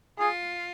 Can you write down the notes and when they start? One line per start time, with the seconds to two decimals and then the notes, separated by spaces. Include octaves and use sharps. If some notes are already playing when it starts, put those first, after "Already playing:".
0.19 F4 G#4